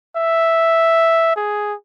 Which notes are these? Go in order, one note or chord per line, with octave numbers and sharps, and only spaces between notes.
E5
G#4